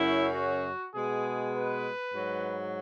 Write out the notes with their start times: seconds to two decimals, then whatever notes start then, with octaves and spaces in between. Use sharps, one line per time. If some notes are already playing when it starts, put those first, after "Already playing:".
Already playing: F#2 C#3 F#3 E4
0.33 F#4
0.94 B2 G#3 G#4
1.53 B4
2.14 G#2 F#3